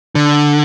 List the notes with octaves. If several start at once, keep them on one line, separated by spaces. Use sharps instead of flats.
D3